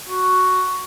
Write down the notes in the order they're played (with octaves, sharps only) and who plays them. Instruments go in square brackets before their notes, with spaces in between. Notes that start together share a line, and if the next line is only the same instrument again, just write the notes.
[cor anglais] F#4